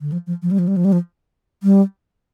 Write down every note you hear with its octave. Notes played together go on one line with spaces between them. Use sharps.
D3
F3
F3
F3
G3
F3
G3
F3
G3
F3
G3